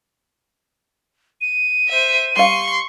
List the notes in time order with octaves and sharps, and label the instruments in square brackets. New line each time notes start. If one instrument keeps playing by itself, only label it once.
[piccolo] D#7
[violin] C5 E5
[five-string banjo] G3 F5 [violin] C6 C#6